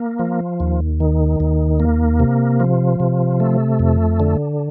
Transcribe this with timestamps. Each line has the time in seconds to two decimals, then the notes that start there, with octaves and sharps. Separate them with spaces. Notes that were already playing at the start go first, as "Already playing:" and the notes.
Already playing: A#3
0.19 F3
0.60 D#2
1.00 D#3
1.40 D#2
1.80 A#3
2.20 C3
2.60 F3
3.00 C3
3.40 A3
3.79 F2
4.20 D3